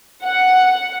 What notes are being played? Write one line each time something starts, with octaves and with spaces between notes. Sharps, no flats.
F#5